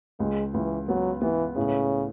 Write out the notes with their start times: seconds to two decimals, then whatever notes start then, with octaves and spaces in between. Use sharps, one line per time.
0.19 C#2 G#3
0.54 C#2 E3
0.87 F#3 B3
1.22 E3 B3
1.56 A2 C#3